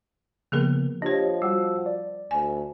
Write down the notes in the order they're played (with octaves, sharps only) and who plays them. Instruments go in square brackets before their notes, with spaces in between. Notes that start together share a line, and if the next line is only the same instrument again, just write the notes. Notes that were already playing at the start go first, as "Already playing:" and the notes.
[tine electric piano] C#3 F3 B3 [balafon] A#3 G#4 A#4
[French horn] F3 [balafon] D4 C#5 [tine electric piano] G4 D#5
[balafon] G3 [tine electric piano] F#4 F#5 E6
[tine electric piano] D5
[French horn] D2 [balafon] G#5